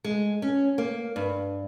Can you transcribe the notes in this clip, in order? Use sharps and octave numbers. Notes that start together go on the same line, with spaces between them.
G#3
C#4
A#3
G2